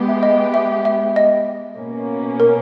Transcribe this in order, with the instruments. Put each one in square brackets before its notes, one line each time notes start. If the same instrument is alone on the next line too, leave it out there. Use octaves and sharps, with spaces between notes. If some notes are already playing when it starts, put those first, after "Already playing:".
Already playing: [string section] G#3 B3 G4
[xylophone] E5
D#5
E5
E5
D#5
[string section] B2 A#3 C#4
[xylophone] A#4